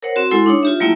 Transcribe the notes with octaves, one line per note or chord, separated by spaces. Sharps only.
A#4 C5 C#5 F#5
C4 F#4
G#3 E4 A4 F#5 C6
D4 D#4 C#5
F4 G4 E5
F#3 A3 A#3 E4 E5 G5